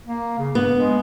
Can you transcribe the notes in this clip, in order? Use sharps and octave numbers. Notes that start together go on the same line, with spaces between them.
A#3
C#3
G2 B3
G#3